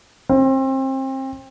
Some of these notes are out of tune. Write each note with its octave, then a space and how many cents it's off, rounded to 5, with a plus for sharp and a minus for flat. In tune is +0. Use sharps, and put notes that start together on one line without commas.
C4 +30